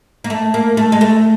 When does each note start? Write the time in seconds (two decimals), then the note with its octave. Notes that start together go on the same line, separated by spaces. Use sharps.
0.24 A#3
0.30 A3
0.54 A#3
0.77 A3
0.92 G#3
1.01 A3